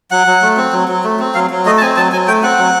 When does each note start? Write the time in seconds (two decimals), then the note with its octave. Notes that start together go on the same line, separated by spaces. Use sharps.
0.11 F#3 F#5
0.27 F#3
0.42 A3
0.57 C4
0.73 F#3
0.88 F#3
1.04 A3
1.20 C4
1.35 F#3 F5
1.50 F#3
1.66 A3 D#5
1.77 A5
1.81 C4 G#5
1.97 F#3 A5
2.12 F#3 G#5
2.28 A3 G5
2.43 C4 F#5
2.59 F#3